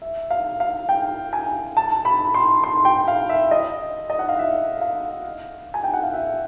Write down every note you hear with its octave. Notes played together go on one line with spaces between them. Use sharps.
E5
F5
F5
G5
G#5
A5
B5
C6
C6
G5
F5
E5
D#5
D#5
F#5
F5
E5
F5
G#5
G5
F#5
F5
E5